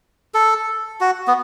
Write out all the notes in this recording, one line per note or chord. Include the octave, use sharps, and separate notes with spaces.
A4
F#4
B3